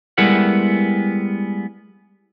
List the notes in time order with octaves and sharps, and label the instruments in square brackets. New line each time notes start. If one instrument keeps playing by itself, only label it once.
[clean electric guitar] G3 G#3 B3 E4 A#4 F#5